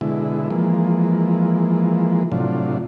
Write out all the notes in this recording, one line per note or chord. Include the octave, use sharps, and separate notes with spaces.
B2 D3 G#3 E4
E3 F3 G#3 A#3
A2 C3 F#3 D4 F4